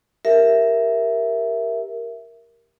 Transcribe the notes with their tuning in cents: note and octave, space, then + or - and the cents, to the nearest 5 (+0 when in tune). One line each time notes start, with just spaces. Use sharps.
G4 +15 A#4 +0 E5 +0